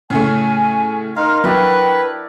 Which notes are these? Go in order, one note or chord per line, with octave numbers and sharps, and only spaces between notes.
A2 C#3 A3 C#4 G#5
D#4 A#4 F5 C6
F#3 D4 E4 F#4 B4 G5